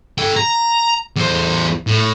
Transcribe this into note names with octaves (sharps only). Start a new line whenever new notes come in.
A4 G5
A#5
E2 C5
A2